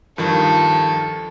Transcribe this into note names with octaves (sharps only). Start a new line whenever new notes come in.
G2 D#3 F3 A4